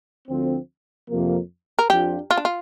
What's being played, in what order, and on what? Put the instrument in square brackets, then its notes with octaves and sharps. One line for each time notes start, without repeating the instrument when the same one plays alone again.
[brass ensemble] D2 D3 F3 C4
F2 C3 F3 A#3
[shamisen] A#4
[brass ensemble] F2 F3 D4 F4 [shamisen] G4
[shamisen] F4
D4
F4